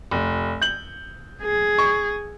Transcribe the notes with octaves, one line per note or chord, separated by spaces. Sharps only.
F1
G6 F#7
G#4
C#6